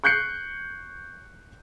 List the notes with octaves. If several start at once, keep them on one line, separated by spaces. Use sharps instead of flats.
C#6 F#6 G6 C7 C#7